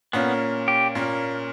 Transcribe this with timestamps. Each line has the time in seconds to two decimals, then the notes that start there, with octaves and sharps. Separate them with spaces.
0.13 A#2 A#3 B3 C#4
0.68 G4
0.95 A#2 A#3 C#4